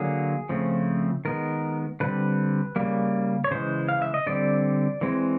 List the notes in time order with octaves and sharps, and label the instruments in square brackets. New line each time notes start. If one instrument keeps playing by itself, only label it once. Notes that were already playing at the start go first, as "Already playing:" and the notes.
Already playing: [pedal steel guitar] D3 F#3 A#3 G#4
C#3 F3 A3 C4
D#3 G#3 B3 A#4
D3 G3 C4 B4
C#3 E3 G3 A#3
C#5
C#3 E3 G#3 C5
F5
E5
D#5
D3 G3 C4 D5
E3 G#3 C4